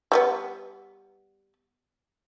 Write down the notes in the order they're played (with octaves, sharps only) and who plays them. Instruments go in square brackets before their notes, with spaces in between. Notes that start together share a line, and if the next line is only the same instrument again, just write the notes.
[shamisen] G3 A3 B3